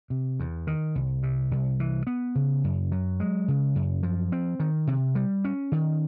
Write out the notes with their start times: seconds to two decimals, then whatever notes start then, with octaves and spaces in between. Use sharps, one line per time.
0.10 C3
0.40 E2
0.67 D#3
0.95 C2
1.23 C3
1.51 C2
1.80 E3
2.07 B3
2.35 C#3
2.64 F#2
2.92 F#3
3.20 G#3
3.48 C#3
3.75 F#2
4.03 F3
4.32 C4
4.60 D#3
4.87 C3
5.15 G3
5.44 C#4
5.72 D#3